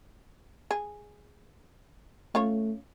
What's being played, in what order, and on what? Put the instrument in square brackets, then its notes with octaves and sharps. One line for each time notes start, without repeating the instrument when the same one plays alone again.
[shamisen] G#4
[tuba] A3 [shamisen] C#4 F4 C#5